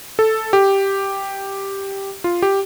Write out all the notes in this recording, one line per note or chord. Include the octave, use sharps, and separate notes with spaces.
A4
G4
F4
G4